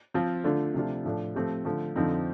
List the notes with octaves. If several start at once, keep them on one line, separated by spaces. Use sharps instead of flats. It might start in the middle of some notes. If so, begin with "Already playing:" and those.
F3 C4 F4
D3 A3 D4 F4
C3 F3 A3 D4 F4
A2 F3 A3 D4
F3 A3 C4 G4
D3 F3 A3
F2 D3 F3 C4 D#4